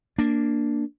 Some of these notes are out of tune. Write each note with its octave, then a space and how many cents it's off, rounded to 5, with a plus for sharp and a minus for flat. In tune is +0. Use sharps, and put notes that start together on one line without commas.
A#3 +0 D4 +0